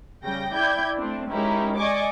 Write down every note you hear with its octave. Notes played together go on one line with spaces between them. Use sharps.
C#3 G3 G5 A#6
E4 D5 G5 G6 G#6
A3 C4 D4
G#3 C#4 D#4 E4 G4 A#4
D5 D#5 G#5 C#6 D6